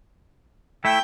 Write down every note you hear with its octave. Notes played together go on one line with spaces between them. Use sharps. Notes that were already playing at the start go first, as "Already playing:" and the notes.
A3 E4 G5